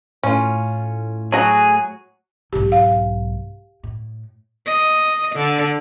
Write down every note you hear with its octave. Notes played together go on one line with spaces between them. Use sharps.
A2 C#4 F4
F#3 F#4 G#4 A#5
B1 G#2 G4
F5
A2
D#5
D3